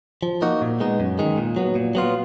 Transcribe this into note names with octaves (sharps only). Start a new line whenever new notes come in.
F3
A#3 D#4 F#4
A#2
G#3 B3 D#4
F#2
D#3 G#3
A#2
F#3 B3
A#2
F#3 B3 F4